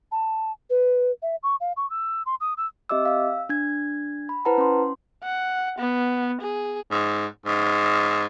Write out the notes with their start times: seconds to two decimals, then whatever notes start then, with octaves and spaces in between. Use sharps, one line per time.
0.12 A5
0.70 B4
1.22 E5
1.43 C#6
1.61 F5
1.77 C#6
1.90 E6
2.26 C6
2.41 D#6
2.57 E6
2.89 C4 G4 D#5 E5 D6 E6
3.05 F5 E6
3.49 D4 G#6
4.29 B5
4.45 E4 B4 C5 F#5 A5 A#5
4.58 C#4 C6
5.24 F#5
5.78 B3
6.42 G#4
6.91 G#2
7.46 G#2